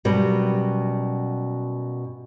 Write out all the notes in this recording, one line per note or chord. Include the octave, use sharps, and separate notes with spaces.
F#2 B2 G3